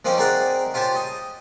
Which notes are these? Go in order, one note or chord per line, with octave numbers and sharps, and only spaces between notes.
F3 A#3 C4 C#4 D#4
C4 D#4 G#4 A#4 D5 F#5
F4 G4 C5 C#5 A5
D#5 D#6